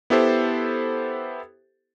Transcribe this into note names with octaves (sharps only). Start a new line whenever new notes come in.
B3 E4 G4 A4 C5